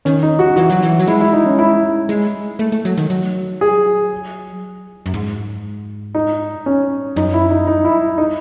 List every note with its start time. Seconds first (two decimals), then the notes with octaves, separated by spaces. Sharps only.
0.05 D#3 C#4
0.23 D#4
0.39 F#4
0.56 E3 F#4
0.70 F#3
0.82 E3
0.99 F#3
1.07 G#3 E4
1.20 E4
1.33 D#4
1.46 C#4
1.59 E4
2.09 G#3
2.59 A3
2.72 A3
2.85 F#3
2.97 D#3
3.10 F#3
3.61 G#4
5.06 F#2
5.14 G#2
6.15 D#4
6.66 C#4
7.16 F#2 D#4
7.34 E4
7.50 D#4
7.67 D#4
7.85 E4
8.18 D#4